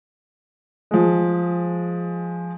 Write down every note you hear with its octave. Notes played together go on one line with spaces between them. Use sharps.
F3 G#3